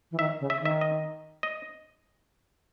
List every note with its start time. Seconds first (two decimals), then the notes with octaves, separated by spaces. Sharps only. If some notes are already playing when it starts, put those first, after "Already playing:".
0.11 E3
0.19 D#3 E5
0.40 C#3
0.50 E5
0.60 D#3
0.65 E5
0.81 D#5
1.43 D#5